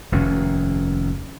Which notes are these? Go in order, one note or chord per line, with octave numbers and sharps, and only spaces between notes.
F1 D#2 D#3 C#4